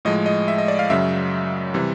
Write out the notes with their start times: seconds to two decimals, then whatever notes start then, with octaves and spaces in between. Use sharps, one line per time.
0.05 A2 F3 G#3 D#5
0.26 D#5
0.48 E5
0.58 D#5
0.68 D5
0.79 F5
0.90 F#2 C#3 F#3 E5
1.74 C3 E3 G3